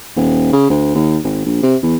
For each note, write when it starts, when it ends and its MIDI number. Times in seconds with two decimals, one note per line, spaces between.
0.16 0.49 27
0.53 0.69 49
0.70 0.95 38
0.95 1.18 39
1.24 1.44 32
1.45 1.59 34
1.63 1.76 48
1.82 1.96 40